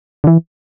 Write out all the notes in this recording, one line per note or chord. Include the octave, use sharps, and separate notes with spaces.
D3
E3